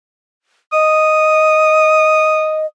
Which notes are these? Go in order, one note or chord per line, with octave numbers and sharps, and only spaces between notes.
D#5 D#6